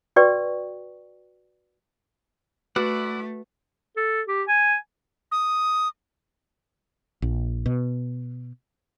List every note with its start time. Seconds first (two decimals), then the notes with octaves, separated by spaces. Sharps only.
0.16 F#4 B4 D5 G5 C#6
2.76 A3 E4 F#4 B4 D5 F#5
3.96 A4
4.28 G4
4.48 G#5
5.32 D#6
7.22 A#1
7.66 B2